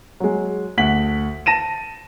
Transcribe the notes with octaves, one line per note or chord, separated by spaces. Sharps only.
F#3 G#3
D2 F#5 B6 F#7
A5 A#6 D#7 E7